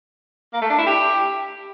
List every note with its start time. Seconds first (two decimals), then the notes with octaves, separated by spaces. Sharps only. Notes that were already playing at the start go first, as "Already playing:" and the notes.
0.53 A#3
0.62 A3
0.70 D4
0.78 E4
0.87 G4